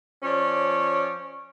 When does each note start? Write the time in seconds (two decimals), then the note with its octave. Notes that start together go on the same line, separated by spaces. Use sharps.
0.23 F3 C#4 C#5 D5